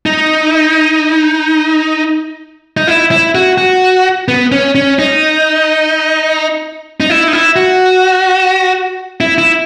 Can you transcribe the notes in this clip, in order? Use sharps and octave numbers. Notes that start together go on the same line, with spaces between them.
D#4
D#4
E4
E4
F#4
F#4
B3
C#4
C#4
D#4
D#4
E4
D#4
E4
F#4
E4
E4